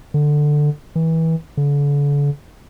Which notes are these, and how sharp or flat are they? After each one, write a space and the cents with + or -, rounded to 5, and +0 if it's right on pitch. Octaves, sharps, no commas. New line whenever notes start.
D3 +10
E3 -25
D3 -40